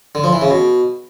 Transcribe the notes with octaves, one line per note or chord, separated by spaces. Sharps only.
D3
F3
E3
C#3
B2